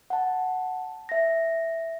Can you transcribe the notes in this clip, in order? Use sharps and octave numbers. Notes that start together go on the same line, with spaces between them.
F#5 A5
E5 A#6